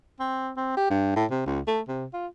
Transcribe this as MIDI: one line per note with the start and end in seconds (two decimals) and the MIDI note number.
0.20 0.51 60
0.56 0.76 60
0.77 0.87 67
0.90 1.13 43
1.16 1.25 45
1.31 1.41 48
1.46 1.60 37
1.67 1.81 57
1.88 2.05 48
2.13 2.27 65